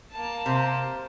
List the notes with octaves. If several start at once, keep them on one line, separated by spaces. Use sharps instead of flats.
A#3 A5
C3 A#4 C5